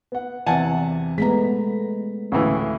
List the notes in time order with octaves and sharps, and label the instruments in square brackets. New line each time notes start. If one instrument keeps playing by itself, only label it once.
[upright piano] B3 F#5
[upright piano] E2 C3 E3 [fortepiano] F#5 G#5 A5
[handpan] G#3 A3 B3 [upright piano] A#5 B6
[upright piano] D2 A2 [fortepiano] C#3 E3